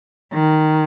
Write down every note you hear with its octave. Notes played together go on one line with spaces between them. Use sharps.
D#3